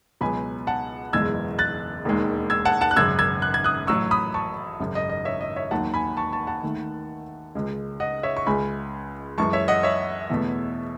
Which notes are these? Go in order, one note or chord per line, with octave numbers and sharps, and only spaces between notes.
C#2 B2 F#3 G#5 B5
F#5 A5
F#1 E2 B2 G#3 E6 G#6
F#6 A6
E1 D#2 D#3 G#3
E6 G#6
F#5 A5
F#5 A5
F#6
G#1 F#2 C#3 E6 G#6
E6 G#6
F#6
G#6
D#6 F#6
A1 A2 F#3 C#6 E6
B5 D#6
A5 C#6
G#1 F#2 C#3
D#5
D#5
C#5 E5
D#5
C#5 E5
E1 D#2 D#3 F#3 F#5 A5
G#5 B5
A5 C#6
A5 C#6
F#5 A5
D#2 D#3 A3
C#2 C#3 G#3
D#5 F#5
C#5 E5
C#6
C#2 C#3 G#3 G#5 B5
F#2 E3 G#3 A5 C#6
C#5 E5
D#5 F#5
C#5 E5
E2 B2 A3